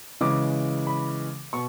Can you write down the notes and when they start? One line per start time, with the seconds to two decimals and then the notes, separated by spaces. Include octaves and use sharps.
0.21 C#3 E3 G#3 D6
0.87 B5
1.53 B2 C#6